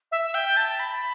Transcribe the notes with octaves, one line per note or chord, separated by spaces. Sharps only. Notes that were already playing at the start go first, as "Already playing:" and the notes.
E5
G5
A5
B5